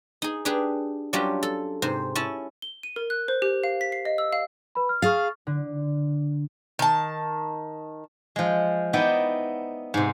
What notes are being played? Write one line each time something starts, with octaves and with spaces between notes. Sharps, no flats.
D#4 G#4
D4 G4 G#4 B4
F#3 G3 C#4 D4 F4 G4
A4
G#2 C3 C5
C#4 E4 A5
G7
D#7
A#4
F#6
C5
G4
F5
B6
C7
D#5
E6
F5
B4 B5
F6
G#4 F5 C#6 F6 A6
D3
D#3 A5
F3 G#3
B3 D#4 E4 D5 D#5 G5
G#2 C3